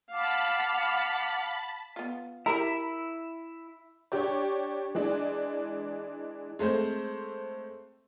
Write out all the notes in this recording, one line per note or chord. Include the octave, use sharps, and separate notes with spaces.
F5 F#5 A5 B5 D6
B3 F4
E4 G4 A#4 A#5
D4 G4 C#5
E3 G#3 D4
G#3 A3 C4 C5